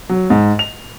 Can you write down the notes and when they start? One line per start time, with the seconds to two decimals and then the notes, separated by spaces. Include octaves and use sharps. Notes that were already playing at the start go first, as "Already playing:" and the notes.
0.09 F#3
0.30 G#2
0.59 F7